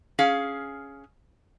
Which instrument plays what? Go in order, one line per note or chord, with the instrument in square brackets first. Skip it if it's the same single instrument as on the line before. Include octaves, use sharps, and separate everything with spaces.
[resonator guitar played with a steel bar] C#4 G#4 F5